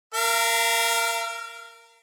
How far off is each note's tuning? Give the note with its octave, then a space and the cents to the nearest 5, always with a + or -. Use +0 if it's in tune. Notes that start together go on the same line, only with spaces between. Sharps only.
A#4 +0 F5 -40 A#5 -30